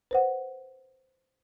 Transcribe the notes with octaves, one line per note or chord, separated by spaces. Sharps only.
B4 C5 F#5